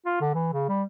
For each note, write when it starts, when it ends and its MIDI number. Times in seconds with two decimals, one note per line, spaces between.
0.06 0.21 65
0.21 0.32 50
0.34 0.49 52
0.53 0.65 49
0.69 0.83 55